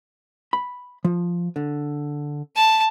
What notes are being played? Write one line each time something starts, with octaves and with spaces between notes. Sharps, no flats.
B5
F3
D3
A5